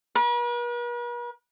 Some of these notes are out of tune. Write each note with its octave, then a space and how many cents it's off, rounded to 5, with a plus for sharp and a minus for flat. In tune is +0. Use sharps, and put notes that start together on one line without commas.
B4 -45